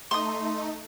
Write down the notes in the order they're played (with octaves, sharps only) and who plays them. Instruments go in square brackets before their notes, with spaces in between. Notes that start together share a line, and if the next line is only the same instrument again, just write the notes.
[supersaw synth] A3 D#4 [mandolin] C6 D#6